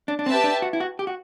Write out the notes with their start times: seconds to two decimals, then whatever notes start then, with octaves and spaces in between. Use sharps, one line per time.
0.08 D4
0.19 D4
0.26 C4 G4 B4 E5 A5
0.44 D4
0.62 F#4
0.73 E4
0.80 F#4
0.99 G4
1.07 F#4